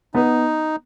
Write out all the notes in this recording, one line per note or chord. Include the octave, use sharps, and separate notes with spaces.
B3 D#4